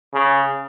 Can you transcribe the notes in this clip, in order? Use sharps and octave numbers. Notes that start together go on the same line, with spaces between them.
C#3